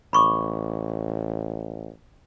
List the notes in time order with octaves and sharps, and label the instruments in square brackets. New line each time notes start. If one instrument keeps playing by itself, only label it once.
[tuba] A1 [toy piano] B5 C#6 D6